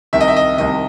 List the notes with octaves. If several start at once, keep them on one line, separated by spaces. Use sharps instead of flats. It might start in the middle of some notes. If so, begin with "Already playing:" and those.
C2 C3 D#3 E5
D#5
E5
D#5
C2 C3 D#3 D#5